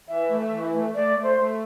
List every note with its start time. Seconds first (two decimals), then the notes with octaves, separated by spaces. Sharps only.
0.08 E3 E5
0.30 A3
0.51 E3
0.73 A3
0.95 A3 D5
1.17 A3
1.23 C5
1.38 A3